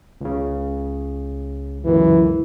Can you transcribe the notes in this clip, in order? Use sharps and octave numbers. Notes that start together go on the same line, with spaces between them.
C#2 C#3
G1 C#2 F#2 E3